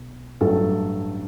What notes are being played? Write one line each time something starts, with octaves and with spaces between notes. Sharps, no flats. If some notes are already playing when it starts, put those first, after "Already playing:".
Already playing: B1
A1 G2 F#3 A3 A4